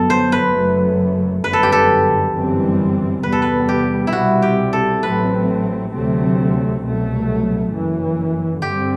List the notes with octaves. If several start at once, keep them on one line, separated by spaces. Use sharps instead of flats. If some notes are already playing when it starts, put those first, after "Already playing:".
Already playing: G1 F#2 F#3 B3 A4
C5
B4
F#1 F#2 F#3 A3
G1 F#2 D3 B4
A4
G4
A4
G1 F#2 E3 G3 C4
E2 C3 G3 B3 B4
A4
B4
G4
E4
C2 B2 G3 C4 F#4
G4
A4
A1 A2 F#3 A3 C4 B4
D2 C3 F#3 A3 C4
C2 B2 F#3 A3
F#1 F#2 E3
G2 D3 G3 C4 G4